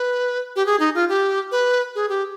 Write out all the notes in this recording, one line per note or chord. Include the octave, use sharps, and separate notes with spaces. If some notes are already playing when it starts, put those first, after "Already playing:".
Already playing: B4
G4
G#4
D#4
F4
G4
B4
G#4
G4